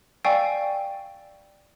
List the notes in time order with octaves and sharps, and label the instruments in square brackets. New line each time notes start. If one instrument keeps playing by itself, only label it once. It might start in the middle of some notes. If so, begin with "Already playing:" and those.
[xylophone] D5 F5 G5 G#5 C#6 E6